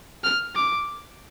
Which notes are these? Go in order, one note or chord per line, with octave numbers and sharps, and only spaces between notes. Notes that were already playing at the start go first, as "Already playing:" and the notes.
F6
D6